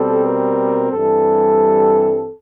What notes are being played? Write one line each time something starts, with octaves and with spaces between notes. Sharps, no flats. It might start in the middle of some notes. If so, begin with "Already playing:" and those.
Already playing: B2 G3 C4 A4
A#4
G2 E3 G3 C4 A4